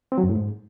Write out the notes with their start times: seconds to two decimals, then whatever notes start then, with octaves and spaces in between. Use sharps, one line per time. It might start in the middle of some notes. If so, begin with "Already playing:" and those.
0.12 C4
0.18 F#3
0.24 F#2
0.29 A2
0.35 G#2